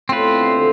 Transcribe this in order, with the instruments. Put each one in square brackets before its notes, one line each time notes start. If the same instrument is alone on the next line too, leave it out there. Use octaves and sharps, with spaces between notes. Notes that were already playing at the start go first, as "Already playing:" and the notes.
[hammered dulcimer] A2 [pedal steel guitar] C4 F4 B4
[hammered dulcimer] B2
D3
C3
D3